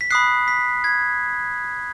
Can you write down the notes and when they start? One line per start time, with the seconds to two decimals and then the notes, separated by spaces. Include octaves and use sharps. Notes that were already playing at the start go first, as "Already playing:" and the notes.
0.01 B6
0.10 B5 D#6 F#6 C7
0.48 B6
0.84 G#6